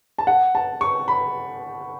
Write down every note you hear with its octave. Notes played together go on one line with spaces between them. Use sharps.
A5
F#5
A5
C#6
B5